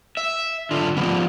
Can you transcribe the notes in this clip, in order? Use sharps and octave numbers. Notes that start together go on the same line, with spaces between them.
E5
D3 F4
F3 G3 B3